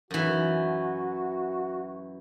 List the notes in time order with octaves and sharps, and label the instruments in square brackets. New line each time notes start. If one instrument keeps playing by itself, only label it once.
[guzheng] F#2 E3 [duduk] F#4